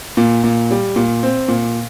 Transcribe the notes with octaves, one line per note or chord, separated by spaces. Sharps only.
A#2
A#2
G3
A#2
C4
A#2